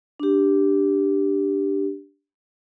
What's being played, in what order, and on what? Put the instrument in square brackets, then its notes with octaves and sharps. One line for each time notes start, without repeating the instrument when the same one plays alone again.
[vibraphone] D4 G4